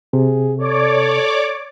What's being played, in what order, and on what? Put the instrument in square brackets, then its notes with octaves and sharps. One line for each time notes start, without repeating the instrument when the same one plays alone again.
[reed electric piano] C3 [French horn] G#4
[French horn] A4 [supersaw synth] C#5 D5 D6